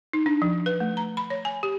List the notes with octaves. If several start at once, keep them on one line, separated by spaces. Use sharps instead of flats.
D#4
D4
F3
B4
A3
A#5
B5
C#5
G#5
G4